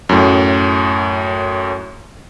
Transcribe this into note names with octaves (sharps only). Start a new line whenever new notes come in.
F#2 A2